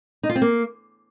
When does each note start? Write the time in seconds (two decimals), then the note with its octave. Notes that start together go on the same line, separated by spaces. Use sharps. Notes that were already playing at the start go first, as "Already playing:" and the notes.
0.23 D#4
0.29 F4
0.35 C4
0.41 A#3